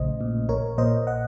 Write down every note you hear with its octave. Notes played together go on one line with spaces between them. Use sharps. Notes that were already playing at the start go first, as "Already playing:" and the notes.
Already playing: A#1 C#3 A3 C5 D#5
A#2
A#1 A#4 C#5
A#2 C5 D#5
D#5 F#5